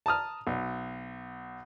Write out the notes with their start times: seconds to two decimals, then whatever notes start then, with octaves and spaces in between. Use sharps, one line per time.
0.06 A5 A#5 D#6 F6
0.47 B1